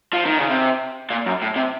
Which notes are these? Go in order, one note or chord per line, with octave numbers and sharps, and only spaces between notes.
F3
D#3
C#3
C3
A#2
F#2
A2
C3